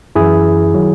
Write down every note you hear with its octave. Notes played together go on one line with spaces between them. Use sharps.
F#2 E3 E4 G#4
D#3 F#3